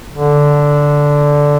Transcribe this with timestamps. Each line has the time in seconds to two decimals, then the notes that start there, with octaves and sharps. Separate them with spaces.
0.12 D3